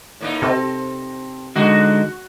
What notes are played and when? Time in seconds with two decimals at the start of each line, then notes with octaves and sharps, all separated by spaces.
0.20 A2 A#3 D#4
0.42 C3 C4 A4
1.56 D3 G#3 D#4 F#4